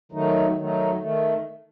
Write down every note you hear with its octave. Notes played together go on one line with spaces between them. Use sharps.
D#3 F#3 A3 D#4
D#3 F#3 A3 D#4
D#3 A3